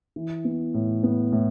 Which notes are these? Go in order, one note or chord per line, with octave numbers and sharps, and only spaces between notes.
E3
B3
A2
B3
A2